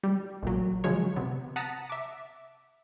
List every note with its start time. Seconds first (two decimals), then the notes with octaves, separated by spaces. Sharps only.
0.03 G3
0.43 A1 A#2 F#3
0.84 D3 F3 F#3 G#3 C#5
1.16 C3 B3
1.56 F#5 A5 A#5 D#6 A#6 B6
1.90 E5 D6